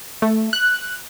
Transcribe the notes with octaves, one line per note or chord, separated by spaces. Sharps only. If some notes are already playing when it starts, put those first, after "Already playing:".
A3
F#6